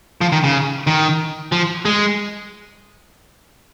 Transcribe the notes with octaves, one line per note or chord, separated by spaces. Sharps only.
F3
D#3
C#3
D#3
F3
G#3